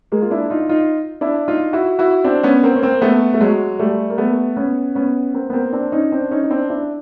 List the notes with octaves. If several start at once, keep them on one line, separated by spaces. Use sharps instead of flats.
G#3 A#3
F4
D4 E4
D#4 F4
D#4 F4
D4 E4
D#4 F4
E4 F#4
E4 F#4
C4 D4
B3 C#4
A#3 C4
C#4
A#3 C4
A3 B3
A3
F#3 G#3
G3 A3
A#3
A3 B3
B3 C#4
B3 C#4
A#3 C4
B3
A#3 C4
C4 D4
C#4 D#4
C4 D4
C#4 D#4
D#4
C4 D4
D4 E4